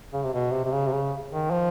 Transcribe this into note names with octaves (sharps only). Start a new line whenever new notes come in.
C#3
C3
B2
C3
C3
C#3
C3
C#3
D#3
F3